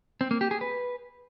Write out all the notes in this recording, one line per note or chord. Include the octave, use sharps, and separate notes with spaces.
C4
A#3
G4
G#4
B4